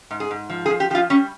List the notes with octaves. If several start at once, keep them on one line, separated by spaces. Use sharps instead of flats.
G#2
G#4
G#2
F3
G#4
F3
G4
F3 F4 G4
G3 C#4